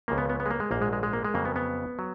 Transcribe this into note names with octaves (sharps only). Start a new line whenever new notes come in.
C#2 C#3 F3 A#3
B3
B3
B3
G#3
A#3
G#3
A#1 G#2 F#3 A#3
G#3
G#3
G#3
A#3
G#3
F2 C#3 F#3 A#3
B3
B3
F#3